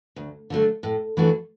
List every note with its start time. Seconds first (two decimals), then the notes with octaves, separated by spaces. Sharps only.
0.16 D2
0.50 D3 F#3 A3 D4
0.83 A2
1.17 E3 A3 D4 F#4